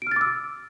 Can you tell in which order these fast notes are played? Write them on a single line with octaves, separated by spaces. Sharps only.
D7 F6 A6 D6 E6